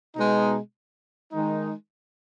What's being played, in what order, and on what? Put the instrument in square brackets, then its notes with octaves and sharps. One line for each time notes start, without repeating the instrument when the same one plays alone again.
[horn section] B2 G#3 D#4
D#3 G#3 D#4